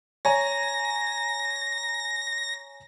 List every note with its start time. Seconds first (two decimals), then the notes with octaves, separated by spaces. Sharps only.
0.25 C#5 G#5 A#5 A#6